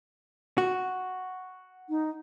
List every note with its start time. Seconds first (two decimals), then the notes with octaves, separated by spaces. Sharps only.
0.58 F#4
1.89 D#4